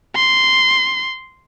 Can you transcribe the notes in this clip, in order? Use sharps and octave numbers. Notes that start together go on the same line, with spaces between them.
C6